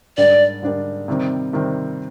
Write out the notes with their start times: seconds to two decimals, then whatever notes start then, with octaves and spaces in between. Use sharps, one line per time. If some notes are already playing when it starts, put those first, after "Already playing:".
0.17 G#2 G3 D4 G4 A#4 D5
0.62 G#2 G3 D4 G4 A#4
1.08 C3 D#3 G3 C4
1.53 C3 D#3 G3 C4